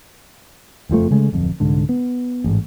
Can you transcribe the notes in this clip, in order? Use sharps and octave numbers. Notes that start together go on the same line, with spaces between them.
F#1 F2 F3 A3
C#3 G#3 A3
D1 F2
C2 G#2 D3
B3
A1 G#2